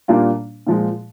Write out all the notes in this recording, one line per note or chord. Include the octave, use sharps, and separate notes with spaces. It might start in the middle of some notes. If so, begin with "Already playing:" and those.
A#2 G3 A#3 D4 F4
A#2 F3 G#3